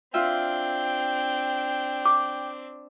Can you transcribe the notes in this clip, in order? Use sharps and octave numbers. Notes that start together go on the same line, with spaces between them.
C4 D4 F4 E5 G5
D6